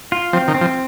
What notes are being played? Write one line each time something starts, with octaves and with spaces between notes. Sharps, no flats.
F4
F3 C4
D#3
C4
F3